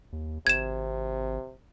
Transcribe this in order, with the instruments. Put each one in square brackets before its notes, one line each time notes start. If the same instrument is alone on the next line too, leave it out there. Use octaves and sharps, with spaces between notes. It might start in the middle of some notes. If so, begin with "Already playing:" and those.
[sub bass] D#2
[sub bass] G#1 [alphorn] C3 [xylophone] G#6 E7